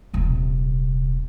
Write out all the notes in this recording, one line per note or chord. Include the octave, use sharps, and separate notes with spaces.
D#1 C3